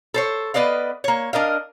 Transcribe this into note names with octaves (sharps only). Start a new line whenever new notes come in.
A4 C5 C#5
B3 B4 D5 D#5 F5
A#3 C#5
D4 A#4 D#5 F5